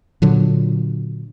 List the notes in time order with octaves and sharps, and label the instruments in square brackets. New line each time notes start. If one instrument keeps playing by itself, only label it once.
[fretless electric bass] A#2 D3 F#3